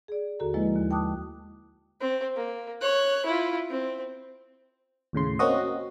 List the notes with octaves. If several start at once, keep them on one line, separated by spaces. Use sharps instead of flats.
G#4 D5
D#2 D3 F#4 A4 A#5
F3 G#3 A#3 E4 B4 D#5
D#2
G5 A5 D6 D#6 F#6
C4
A#3
C#5 F#6
E4 F4
C4
D#2 A2 C#3 C6
A#3 C4 C#4 F#4 D#5